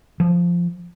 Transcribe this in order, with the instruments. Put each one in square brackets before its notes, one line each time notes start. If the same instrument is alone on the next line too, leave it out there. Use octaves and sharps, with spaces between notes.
[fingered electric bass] F3